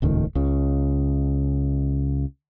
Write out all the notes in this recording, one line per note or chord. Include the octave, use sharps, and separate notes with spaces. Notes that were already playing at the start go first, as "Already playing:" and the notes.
D#1 C#2 A2 D#3
C#2 C#3